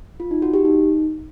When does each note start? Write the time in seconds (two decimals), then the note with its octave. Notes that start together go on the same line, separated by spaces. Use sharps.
0.20 F4
0.31 D#4
0.42 F#4
0.54 G4
0.65 D#4